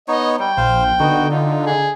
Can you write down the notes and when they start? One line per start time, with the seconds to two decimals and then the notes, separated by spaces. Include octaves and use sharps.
0.08 B3 D#4 C#5 D#5
0.39 G3 G5
0.57 A#1 C5 F5
1.00 D3 B3 D#4 F#4
1.31 D#4 F4
1.67 G#4